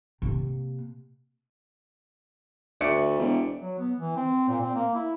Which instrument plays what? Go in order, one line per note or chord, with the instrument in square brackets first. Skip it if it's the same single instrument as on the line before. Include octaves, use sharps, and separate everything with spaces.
[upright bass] C3 A#3
[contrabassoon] D2 [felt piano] D5 E5 C#7
[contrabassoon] E1
[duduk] F#3
B3
E3
C4
A#2
C4
A#3
E4